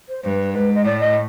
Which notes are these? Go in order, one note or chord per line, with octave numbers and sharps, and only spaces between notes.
C5
G2 B4 C5
G#2 B4
D#5
A2 D5
D#5